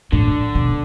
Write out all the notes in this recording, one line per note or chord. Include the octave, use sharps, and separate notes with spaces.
A2 D3
B2